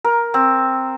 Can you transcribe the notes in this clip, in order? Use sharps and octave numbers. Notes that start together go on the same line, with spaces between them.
A#4
C4